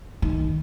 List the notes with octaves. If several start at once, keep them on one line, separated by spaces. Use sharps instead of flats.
D#3